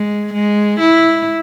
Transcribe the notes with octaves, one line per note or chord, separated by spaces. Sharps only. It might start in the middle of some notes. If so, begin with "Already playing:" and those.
Already playing: G#3
G#3
E4